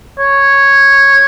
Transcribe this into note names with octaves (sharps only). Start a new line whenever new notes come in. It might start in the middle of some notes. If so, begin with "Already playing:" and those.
C#5